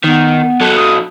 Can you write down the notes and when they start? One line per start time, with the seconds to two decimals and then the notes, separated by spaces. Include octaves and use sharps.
0.04 D#3 B3
0.61 F#3 A4
0.77 D#6